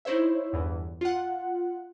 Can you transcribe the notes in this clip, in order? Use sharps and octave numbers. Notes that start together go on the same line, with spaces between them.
D#4 E4 C5 C#5 E5
G1 E2 E3
F4 F#5